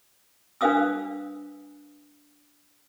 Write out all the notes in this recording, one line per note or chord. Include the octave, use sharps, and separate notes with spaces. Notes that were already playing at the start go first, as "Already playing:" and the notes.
D4 B4 C5 F5 D#6 E6